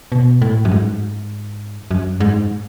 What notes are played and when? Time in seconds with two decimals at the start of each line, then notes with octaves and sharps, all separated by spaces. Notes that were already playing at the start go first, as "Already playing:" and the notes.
0.12 B2
0.42 A2
0.65 F#2
0.71 G#2
1.91 F#2
2.20 G#2